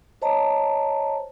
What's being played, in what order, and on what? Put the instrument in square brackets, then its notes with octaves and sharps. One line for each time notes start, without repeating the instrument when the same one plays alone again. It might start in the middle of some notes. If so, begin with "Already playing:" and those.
[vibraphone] C5 C#5 D#5 A5 A#5